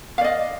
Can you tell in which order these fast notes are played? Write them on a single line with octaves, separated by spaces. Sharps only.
F5 D5 D#5